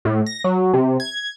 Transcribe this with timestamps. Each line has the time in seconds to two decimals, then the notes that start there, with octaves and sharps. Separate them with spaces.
0.05 A2
0.26 A#6
0.44 F#3
0.73 C3
1.00 G#6